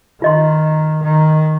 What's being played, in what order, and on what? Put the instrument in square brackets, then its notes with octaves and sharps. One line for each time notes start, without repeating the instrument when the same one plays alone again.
[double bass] D#3 [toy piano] F4 D#5 C6
[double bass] D#3